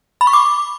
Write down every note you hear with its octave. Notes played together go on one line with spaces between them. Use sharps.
B5
C#6
D6